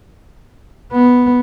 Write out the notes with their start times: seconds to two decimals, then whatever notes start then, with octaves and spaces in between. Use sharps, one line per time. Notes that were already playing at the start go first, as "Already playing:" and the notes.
0.93 B3